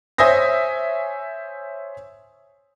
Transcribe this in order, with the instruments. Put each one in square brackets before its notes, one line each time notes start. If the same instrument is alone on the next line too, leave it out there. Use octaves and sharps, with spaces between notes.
[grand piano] C5 C#5 E5 G#5 D#6 A#6